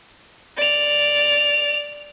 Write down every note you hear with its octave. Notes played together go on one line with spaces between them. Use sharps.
D5 F7